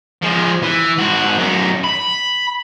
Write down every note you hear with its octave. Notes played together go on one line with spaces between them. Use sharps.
F3 G#3
E3
G#2 F#4
F#2 D#4
B5